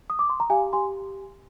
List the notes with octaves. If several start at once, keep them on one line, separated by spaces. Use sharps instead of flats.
D#6
D6
C6
A#5
G4 F5 G#5
G4 G#5 C6